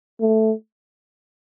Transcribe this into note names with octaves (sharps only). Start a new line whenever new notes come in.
A3